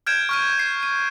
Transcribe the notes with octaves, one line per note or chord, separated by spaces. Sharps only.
F6 G6 G#6 D7 E7
C#6 F6 D#7
C7
D#7